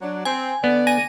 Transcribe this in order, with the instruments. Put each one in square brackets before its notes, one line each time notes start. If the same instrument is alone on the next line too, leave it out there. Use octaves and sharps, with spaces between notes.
[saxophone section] F#3 D4
[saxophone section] C4 [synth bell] G#5
[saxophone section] D3 D5 [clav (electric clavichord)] B3
[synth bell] G#5 A#6 D#7